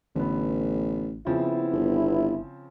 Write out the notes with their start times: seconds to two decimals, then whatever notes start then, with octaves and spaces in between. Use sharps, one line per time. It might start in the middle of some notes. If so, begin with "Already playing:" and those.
0.15 A1 D3 B3
1.27 C#3 F3 B3 C4 E4
1.72 G1